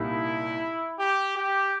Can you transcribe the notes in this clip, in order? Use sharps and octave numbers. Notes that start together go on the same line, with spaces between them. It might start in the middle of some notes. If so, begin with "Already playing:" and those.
Already playing: C2 A#2 G3 D#4 E4
G4
G4